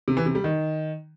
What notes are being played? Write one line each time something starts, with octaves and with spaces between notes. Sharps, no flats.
C3
E3
C3
G3
D#3